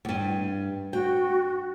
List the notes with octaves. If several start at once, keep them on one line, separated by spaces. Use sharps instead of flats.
E2 G2
F#4 G5